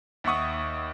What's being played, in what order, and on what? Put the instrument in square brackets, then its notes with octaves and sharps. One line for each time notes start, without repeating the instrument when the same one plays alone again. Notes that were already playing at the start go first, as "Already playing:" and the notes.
[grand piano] D#2 E5 F#5 C#6 D#6